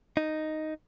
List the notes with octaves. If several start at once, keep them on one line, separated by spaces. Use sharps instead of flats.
D#4